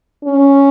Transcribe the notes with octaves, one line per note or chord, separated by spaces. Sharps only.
C#4